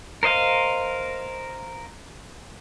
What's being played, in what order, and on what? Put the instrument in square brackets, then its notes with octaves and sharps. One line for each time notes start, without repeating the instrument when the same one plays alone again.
[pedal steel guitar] A#4 C5 D#5 F5